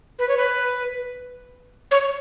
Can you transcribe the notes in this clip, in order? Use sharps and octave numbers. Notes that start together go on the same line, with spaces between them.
B4
C#5
B4
C#5